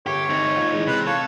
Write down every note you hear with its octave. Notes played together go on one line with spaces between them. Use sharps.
G1 G4 C#5
C4 D#4
A#2
E3 G#3
C3 B4
A4 C#5 F5 F#6